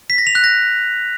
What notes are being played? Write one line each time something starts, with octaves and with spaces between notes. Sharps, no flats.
B6
A#6
F7
F#6
A#6